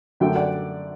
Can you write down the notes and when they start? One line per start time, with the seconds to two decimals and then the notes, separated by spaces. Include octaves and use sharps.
0.20 F#2 D3 F#3 A3 E5 G5
0.35 D5 F#5